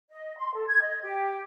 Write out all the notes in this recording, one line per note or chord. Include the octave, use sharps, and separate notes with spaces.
D#5
C6
A4
G#6
D#5
G4